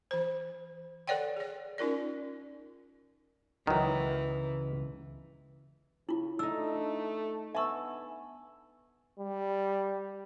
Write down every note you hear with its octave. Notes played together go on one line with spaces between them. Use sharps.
E3 C5
A4 B4 C#5 D5 F#5 G5
G#4 D5
C#4 D#4 F4 A#4 D5
C#2 D#3 E3 F#3
C#3 E4 F4
A3 D4 D#4 E6
B3 E5 G#5 A5 C#6 E6
G3